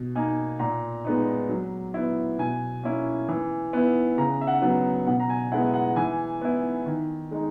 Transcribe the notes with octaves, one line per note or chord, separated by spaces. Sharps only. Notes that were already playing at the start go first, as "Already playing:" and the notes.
Already playing: B2
A#3 D#4 G#5
A#2 A#5
G#3 B3 D#4
F#3
B3 E4
B2 G#5
A#3 C#4 E4
E3
B3 E4
C#3 A#5
E5
F#5
F#3 B3
B2 F#5
A#5
G#5
G#3 B3 E4 F#5
F#5
E3 G#5
B3 E4
D#3
G#3 D#4